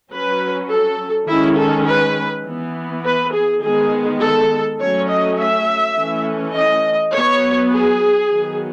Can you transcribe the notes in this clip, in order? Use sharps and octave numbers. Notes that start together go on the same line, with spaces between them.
F#3 C#4 B4
A4
D#3 G#3 C#4 E4
A4
B4
E3 B3
B4
G#4
D#3 G#3 B3 G#4
A4
F#3 A3 C#4 C#5
D#5
E5
E3 A3 C#4
D#5
F#3 B3 C#5
G#4
D#3 F#3 B3